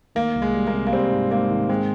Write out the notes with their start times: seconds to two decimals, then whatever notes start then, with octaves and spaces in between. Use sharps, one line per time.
0.15 D#3 A#3
0.36 C2
0.42 G#3
0.54 G3
0.67 A#3
0.74 C3
0.87 A#3
0.92 G3 C4
1.12 G#2
1.31 G#2 A#3
1.50 D#3
1.69 G#3 C4